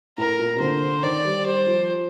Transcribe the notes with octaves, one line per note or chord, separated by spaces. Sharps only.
A2 A#4
A#2
C3
D3 C5
D#3 D5
G3
G3 C5
F3